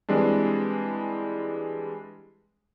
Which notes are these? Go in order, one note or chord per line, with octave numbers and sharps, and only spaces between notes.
E3 G3 G#3 C4 D4